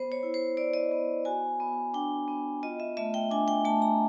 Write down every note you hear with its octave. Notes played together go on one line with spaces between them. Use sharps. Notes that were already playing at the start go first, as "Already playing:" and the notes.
Already playing: B3 C5
C#5
E4
C5
E4 D5
D#5
B3
F#4 G#5
B3
D4 G5
B3
F4 D#5
E5
A3 E5
G5
D4 G#5
G5
A3 A5
A#5